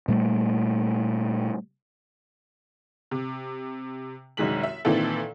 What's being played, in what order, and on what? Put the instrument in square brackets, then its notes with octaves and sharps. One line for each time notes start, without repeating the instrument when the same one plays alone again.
[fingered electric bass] A#2 G3 A3
[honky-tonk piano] C3
C2 F#2 D#3 G#3 B6 F#7
E5
A#2 D#3 E3 C4 E4 A4